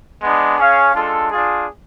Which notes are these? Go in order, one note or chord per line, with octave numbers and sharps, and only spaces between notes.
G#3 B3 D4
C#4 G#4 C#5 F5
G#3 D4 F4 A4
D4 F4 G#4